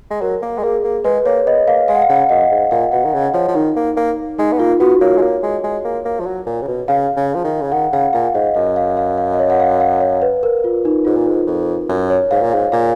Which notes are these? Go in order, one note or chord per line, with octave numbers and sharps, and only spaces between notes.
G#3
F#3 A#4
A#3
G#3
A#3 G#4
A#3
G#3 B4
A#3 C#5
B3 D#5
A#3 F5
G#3 F5
F#5
F5
C#3 F#5
F5
F#2 D#5
G#2
A#2 F5
B2 F#5
D#3
C#3
F3 C#5
F3
D#3 D#4
A#3
A#3
G#3 D#4
B3
A#3 F4
B3 F#4
A#3 C#5
G#3
A#3
G#3
G#3
A#3
A#3
F3
F#3
A#2
C#3
B2
C#3 F5
C#3
F3
D#3
C#3
D#3 F#5
C#3 F5
A#2 F5
G#2 D#5
F#2 D#5
F5
F5
F5
D#5
C#5
F#5
F5
F5
C#5
B4
A#4
F4
D#4
G#2 F4
A#2
G#2
F2
F#2
C#5
G#2 F5
A#2
F5
G#2
A#2 F5